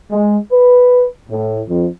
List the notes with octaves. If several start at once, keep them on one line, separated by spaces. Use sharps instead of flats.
G#3
B4
A2
F2